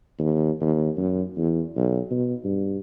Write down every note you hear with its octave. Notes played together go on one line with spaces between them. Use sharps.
D#2
D#2
F#2
E2
B1
B2
G2